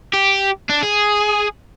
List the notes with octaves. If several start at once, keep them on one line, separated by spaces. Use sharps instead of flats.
G4
D4
G#4